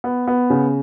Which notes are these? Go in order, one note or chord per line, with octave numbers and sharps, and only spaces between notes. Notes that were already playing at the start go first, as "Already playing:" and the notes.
B3
B3
C#3